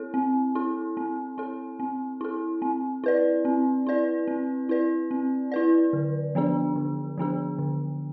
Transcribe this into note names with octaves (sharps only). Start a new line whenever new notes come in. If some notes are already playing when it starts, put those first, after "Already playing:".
Already playing: C4 E4 A4
C4
E4 A4
C4
E4 A4
C4
E4 A4
C4
E4 B4 D5
C4
E4 B4 D5
C4
E4 B4 D5
C4
E4 B4 D5
D3
F3 B3 D4 G#4
D3
F3 B3 D4 G#4
D3